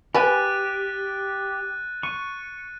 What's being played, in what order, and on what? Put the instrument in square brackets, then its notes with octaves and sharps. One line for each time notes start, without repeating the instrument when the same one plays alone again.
[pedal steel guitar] G4 [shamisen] B4 G#5 [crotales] F#6 A6 D#7
[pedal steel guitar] C#6 [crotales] D#7